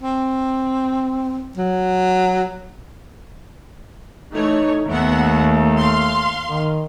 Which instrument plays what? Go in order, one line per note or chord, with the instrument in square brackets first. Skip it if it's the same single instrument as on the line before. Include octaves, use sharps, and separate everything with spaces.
[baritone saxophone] C4
F#3
[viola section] E3 A3 C#5 [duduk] D#4
[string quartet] D#2 [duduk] A3 [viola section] B3 E5 F#5
[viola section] F5 C6
[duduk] D#3